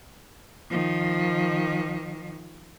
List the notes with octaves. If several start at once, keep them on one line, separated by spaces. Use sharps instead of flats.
D#3 F3